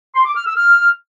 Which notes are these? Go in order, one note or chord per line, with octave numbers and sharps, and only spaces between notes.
C6
D6
F6
E6
F6